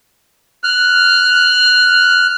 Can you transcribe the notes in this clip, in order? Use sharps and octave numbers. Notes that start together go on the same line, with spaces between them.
F6 F#6